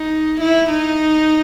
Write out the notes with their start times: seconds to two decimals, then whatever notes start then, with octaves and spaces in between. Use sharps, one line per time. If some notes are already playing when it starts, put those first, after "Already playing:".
Already playing: D#4
0.41 E4
0.70 D#4